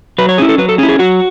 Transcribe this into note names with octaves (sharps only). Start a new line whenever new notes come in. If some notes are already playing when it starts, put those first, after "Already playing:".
F#3 B4
C#5
C#4 E4 G#4
A4
F#3 B4
A4
C#4 E4 G#4
G#4
F#3 F#4